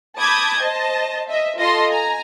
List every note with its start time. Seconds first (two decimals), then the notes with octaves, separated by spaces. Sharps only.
0.18 A5 B5 D6 D#6 G6 G#6
0.60 C5 D#5 A5
1.29 D#5 E5
1.59 F4 A4 D#5 A5 C6
1.89 G#5 A#5